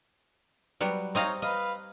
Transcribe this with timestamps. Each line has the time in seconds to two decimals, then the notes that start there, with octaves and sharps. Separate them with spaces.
0.81 F#3 G3 B3
1.15 C4 D#4 C#5 D#5 F5 A#5
1.42 B4 D#5 F5